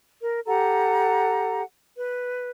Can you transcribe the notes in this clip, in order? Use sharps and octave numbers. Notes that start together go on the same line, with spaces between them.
A#4
G4 A4 F#5 A#5
B4